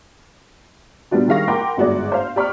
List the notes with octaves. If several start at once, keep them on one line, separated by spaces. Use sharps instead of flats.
A#2 G3 B3 D4 F#4
D#3 G3 G#4 F5 C#6 A#6
A#4 F#5 G5 B5 C6 D6
G1 G#2 F#4 G#4 D5
C5 F5
G4 D5 B5 C#6 D6 F6